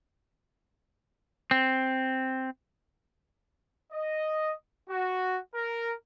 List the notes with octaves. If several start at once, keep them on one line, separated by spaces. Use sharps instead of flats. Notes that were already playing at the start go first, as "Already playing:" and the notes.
C4
D#5
F#4
A#4